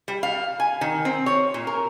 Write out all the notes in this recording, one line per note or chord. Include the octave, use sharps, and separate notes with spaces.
G3
F5
G#5
D#3
C4
C#5
A#2
A#4